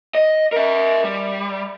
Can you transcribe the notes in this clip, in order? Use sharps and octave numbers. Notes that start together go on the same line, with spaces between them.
D#5
A#4 E5
G3